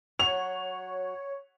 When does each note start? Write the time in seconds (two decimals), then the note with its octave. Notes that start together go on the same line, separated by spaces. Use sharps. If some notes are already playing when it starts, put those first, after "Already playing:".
0.19 F#3 C#5 F7